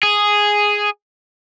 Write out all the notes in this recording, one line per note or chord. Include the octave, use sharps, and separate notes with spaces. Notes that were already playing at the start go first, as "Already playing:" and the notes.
G#4